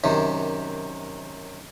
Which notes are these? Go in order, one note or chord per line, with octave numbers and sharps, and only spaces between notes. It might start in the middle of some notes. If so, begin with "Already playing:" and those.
F#2 C3 D#3